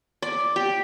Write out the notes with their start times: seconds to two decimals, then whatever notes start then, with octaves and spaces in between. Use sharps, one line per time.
0.22 D5
0.56 G4